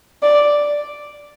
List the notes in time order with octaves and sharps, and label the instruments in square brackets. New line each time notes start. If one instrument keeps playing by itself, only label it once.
[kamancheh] D5